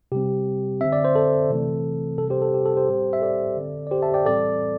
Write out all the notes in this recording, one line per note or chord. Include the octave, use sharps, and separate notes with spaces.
C3 G3 C4 G4
D3 C4 E5
D5
C5
A4
C3 E3 A3 C4
C3 G3 C4 A4
G4 C5
A4
G4
A4
G4 C5
A2 G3 C4
E5
A4 D5
D3 C4
D5
G4 C5
E5 A5
D5 G5
A2 E3 G3 C4 A4 D5